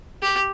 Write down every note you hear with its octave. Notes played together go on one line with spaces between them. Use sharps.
G4